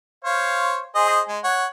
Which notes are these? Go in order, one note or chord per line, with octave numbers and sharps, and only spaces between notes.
C5 C#5 F5
G#4 C5 D#5
G#3
C#5 F#5